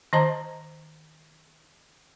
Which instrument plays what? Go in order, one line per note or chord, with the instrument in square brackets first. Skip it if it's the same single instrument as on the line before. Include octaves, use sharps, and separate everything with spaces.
[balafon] D#3 C5 D#5 A5 A#5